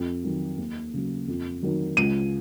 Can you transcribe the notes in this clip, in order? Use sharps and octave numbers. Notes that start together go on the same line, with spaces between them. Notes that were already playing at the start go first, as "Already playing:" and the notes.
Already playing: F2
D#3 F#3
D#2
C#3 F#3
F2
D#3 F#3
C#2 D#7